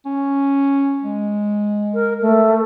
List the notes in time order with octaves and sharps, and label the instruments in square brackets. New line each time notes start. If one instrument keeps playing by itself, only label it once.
[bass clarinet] C#4
G#3
[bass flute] A#4
A3